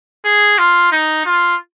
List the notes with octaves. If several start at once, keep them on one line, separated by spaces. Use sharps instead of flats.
G#4
F4
D#4
F4